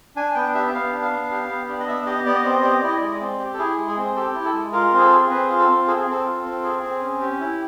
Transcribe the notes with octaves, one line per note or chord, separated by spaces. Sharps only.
D4 G#5
B3 G5
G4 E5
B3 F5
D4
F5
B3
G4
B3
D4
D#5
B3 E5
G4 D#5
B3 D5
D#5
C4 D5
D#5
G4 D5
D#5
D5
E4 D#5
D5
G#3 D#5
D5
C4
G4
A4
E4 G#4
G#3
G#4
C4
G4 A4
E4
A4
G#3
F4 A#4
C4 G#4
A4
G#4
C4 B4
F4
A4
C4
G#4 A4
G#4
C4 A4
F4
C4
G#4
C4
C#4
G4
E4